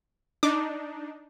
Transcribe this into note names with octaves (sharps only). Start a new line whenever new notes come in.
D4 D#4 D6